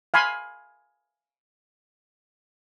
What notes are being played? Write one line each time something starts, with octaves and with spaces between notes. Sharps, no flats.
F5 G#5 B5 C6